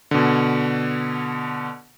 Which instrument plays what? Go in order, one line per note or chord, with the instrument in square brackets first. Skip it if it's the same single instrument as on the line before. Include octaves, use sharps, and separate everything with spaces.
[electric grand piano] B2 D3